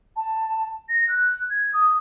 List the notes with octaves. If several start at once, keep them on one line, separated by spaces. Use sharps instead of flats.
A5
A#6
F#6
G#6
D#6